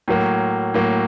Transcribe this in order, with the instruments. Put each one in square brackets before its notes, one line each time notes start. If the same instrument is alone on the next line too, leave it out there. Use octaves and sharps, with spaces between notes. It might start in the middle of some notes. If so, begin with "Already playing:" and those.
[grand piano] A2 F#3 A#3
A2 F#3 A#3